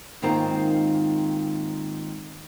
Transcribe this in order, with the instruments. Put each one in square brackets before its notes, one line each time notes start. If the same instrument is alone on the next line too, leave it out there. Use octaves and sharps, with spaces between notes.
[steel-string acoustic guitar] G#2 D#3 A#3 C4 F4 A#5